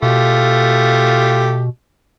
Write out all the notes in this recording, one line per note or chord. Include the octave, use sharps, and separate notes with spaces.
B2 A3 F4 G4